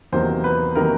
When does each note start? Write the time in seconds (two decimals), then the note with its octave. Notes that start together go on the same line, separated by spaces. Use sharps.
0.12 E2 C3 D#3 F#3 A#3 C5
0.44 B4
0.75 C3 D#3 F#3 A#3 A#4